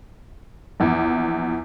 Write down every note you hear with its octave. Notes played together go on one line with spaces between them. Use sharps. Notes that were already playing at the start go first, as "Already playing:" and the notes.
A#1 E2